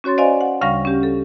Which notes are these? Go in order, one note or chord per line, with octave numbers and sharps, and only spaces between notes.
C#4 F#4 C#5 C6 A6
C5 D5 D#5 F5 G#5 C6
F#5
D2 C#3 G3 F5 C#6 A#6
C#4 G4
A4